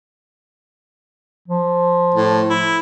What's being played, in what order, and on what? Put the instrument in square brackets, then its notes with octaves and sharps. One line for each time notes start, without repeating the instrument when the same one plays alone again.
[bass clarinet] F3
[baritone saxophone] A2
E4